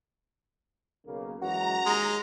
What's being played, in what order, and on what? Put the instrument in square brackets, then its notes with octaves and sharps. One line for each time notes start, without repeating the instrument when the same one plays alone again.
[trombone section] B1 C#3 A#3
[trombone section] F#2 E3 G#3 [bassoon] F#4 [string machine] A#5
[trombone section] D#2 [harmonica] G#3